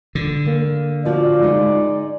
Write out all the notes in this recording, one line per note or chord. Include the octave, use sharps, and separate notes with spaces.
D3
A#3
F3 F4 F#4 D5
G#3 D#4 D#5